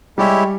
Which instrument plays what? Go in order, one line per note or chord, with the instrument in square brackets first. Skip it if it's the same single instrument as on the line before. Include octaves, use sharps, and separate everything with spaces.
[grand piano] G3 [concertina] G#3 E4 G4 C#5 E5